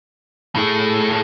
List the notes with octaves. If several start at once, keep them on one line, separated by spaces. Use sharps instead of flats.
A2 A3 G#4